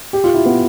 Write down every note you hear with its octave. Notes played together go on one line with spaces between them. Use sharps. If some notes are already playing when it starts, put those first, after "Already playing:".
G4
F4
E4
B3